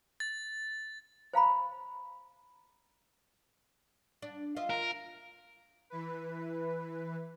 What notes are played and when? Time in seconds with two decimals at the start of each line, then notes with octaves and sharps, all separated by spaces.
0.20 A6
1.33 C5 F5 A#5 B5
4.22 D4
4.56 F4 D#5 E5
4.70 A#4
5.90 E3 B4